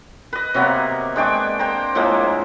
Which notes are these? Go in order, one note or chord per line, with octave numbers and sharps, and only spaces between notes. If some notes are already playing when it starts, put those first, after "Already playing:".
B4 D#5
C3 F#3 A#3 B3
G#3 D4 G5 C#6
C5 G5 A#5
A2 F3 G#3 A#3